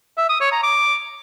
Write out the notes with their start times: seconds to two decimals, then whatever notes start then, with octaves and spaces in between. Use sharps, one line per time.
0.18 E5
0.29 D#6
0.40 C#5
0.52 A#5
0.63 D6